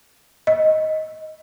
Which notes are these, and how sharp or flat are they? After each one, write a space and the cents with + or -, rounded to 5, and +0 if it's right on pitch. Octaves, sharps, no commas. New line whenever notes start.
D#5 +10